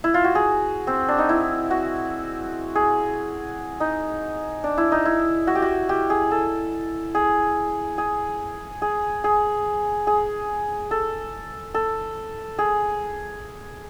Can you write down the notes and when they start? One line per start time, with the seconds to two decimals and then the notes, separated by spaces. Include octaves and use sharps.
0.04 E4
0.14 F4
0.24 F#4
0.35 G#4
0.87 C4
1.09 D4
1.19 D#4
1.29 E4
1.71 F#4
2.75 G#4
3.80 D#4
4.64 D4
4.78 E4
4.92 D#4
5.05 E4
5.47 F#4
5.55 G4
5.62 F#4
5.89 G4
6.10 G#4
6.31 A4
7.15 G#4
7.98 G#4
8.82 G#4
9.24 G#4
10.07 G#4
10.91 A4
11.74 A4
12.59 G#4